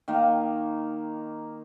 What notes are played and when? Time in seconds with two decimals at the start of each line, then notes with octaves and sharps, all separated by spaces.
0.08 D#3 A#3